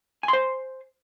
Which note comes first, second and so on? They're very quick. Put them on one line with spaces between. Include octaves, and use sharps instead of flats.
G#5 C6 C5